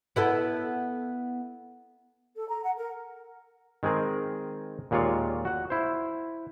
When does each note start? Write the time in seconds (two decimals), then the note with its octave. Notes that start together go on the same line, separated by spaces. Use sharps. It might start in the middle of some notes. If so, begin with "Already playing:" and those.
0.16 B3 E4 A4
2.36 A4
2.49 A#5
2.63 F#5
2.76 A#4
3.83 D#3 G#3 C4 G#4 A#4
4.91 D#2 A#2 G#3 F4 C#5 D5
5.45 F#4 F#5
5.70 E4 C5